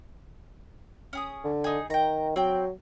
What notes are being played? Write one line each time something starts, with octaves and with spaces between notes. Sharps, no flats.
C#4 G#4 D#6
D3
D#4 G#4
D#3 G5 A#5
F#3 C4 G5